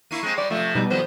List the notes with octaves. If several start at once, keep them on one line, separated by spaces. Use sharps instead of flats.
A#3 E4 C#6 C7 D#7
G#3 C4
G3 D5
C3 F3 A3
B2 G3 D#4
F2 D#3 B3 C5